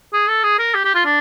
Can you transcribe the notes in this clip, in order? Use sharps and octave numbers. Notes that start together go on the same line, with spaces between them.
G#4
A4
G#4
A#4
G4
G4
F4
D4